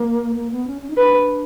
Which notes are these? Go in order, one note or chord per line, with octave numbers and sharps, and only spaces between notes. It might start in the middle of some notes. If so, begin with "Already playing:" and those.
Already playing: A#3
A#3
B3
C#4
C#4
D#4
D4 B4